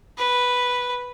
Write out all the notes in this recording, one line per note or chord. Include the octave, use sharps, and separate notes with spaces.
B4